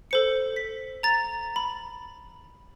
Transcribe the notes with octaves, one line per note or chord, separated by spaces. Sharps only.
A4 C5 C#7
B6
A#5 A6 F7
B5